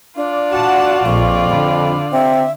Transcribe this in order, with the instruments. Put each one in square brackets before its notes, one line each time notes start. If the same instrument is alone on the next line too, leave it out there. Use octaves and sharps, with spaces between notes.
[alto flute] D4 [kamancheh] F4 D5
[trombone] F#4 [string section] F#5 A5
[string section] A#1 [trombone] F2 [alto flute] C#6
[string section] D3 [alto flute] B5
[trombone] C4 [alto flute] E5